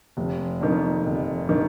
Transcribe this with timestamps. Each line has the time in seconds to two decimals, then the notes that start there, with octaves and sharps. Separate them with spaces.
0.17 F1
0.61 F2 D#3
1.06 F1
1.49 D#3